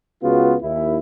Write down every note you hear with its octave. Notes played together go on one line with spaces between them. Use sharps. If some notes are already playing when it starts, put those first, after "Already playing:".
C#2 C#3 B3 F4 F#4
D#2 E4